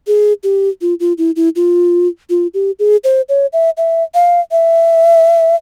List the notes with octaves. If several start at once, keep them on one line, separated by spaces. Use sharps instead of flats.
G#4
G4
F4
F4
E4
E4
F4
F4
G4
G#4
C5
C#5
E5
E5
F5
E5